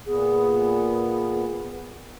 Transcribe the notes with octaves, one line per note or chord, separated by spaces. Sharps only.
A#2 B3 G#4